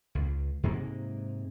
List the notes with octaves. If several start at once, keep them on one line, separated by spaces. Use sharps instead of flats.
C#2
G#2 C3 G#3 A#3